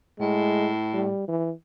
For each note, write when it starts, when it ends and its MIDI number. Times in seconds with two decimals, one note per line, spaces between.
0.20 1.10 45
0.20 0.70 56
0.94 1.26 55
1.28 1.51 52